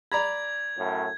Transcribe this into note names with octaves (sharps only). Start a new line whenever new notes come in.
D5 A#5 B5 G#6
F#2 A2